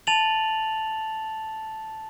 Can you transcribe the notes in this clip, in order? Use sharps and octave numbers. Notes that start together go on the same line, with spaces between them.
A5 A6 F7 F#7